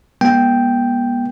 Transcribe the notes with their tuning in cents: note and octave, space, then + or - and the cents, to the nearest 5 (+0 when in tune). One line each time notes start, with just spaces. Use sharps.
G#3 -20 B3 -40 G5 +0